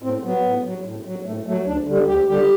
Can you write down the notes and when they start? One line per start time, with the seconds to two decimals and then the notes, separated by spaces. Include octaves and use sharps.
0.02 A2 C4
0.24 F#3 B3
0.44 A2
0.64 F#3
0.85 A2
1.05 F#3
1.26 A2 A3
1.47 F#3 A3
1.66 D2 D4
1.87 D3 G3
2.07 D2 G4
2.28 D3 G3 G4